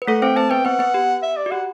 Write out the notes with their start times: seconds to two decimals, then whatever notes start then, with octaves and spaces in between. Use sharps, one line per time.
0.02 B4
0.07 A3 A4 F#5
0.22 C4 C5 G5
0.36 C4 C5 A5
0.51 B3 B4 G5
0.65 B3 B4 F#5
0.79 B3 B4
0.94 G4
1.23 E5
1.37 D5
1.46 F#4
1.51 G4 F#5